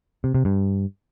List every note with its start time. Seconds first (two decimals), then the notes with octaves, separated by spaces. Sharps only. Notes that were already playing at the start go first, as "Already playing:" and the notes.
0.24 C3
0.35 C3
0.45 G2